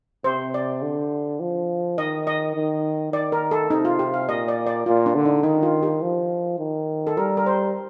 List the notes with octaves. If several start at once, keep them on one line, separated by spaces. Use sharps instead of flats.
C3 C5
D5
D3
F3
D#3 D#5
D#5
D#3
D#3 D5
A#4
A4
C3 D#4
F4
G4
F5
A#2 D#5
D5
D5
A#2 F4
D4
D3
D#4
D#3 D#4
F4
G4
F3
D#3
A4
G3 A#4
A#4
C5